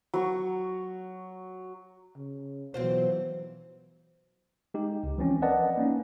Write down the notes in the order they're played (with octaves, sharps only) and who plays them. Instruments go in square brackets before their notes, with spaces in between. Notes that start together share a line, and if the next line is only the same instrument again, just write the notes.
[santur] F#3 C#6
[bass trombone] C#3
[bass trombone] B2 [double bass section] E3 F#3 [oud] C4 F4 C5
[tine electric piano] G#3 D#4 G4
C#2
E3 F3 C4 C#4
A#4 B4 D5 D#5 F#5 A5
A#3 C#4 D#4